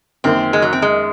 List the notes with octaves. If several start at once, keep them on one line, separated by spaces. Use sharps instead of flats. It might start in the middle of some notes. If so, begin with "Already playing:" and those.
F#2 D#3 A#3 C4
G#3
F#3
C4
G#3